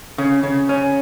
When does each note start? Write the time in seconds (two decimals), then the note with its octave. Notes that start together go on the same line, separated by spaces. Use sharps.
0.18 C#3
0.43 C#3
0.69 C#4